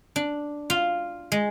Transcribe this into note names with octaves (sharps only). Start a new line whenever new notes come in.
D4
F4
G#3